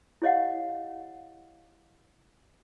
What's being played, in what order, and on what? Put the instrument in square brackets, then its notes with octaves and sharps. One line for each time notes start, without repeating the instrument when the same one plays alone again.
[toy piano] E4 G4 C#5 D#5 F5 F#5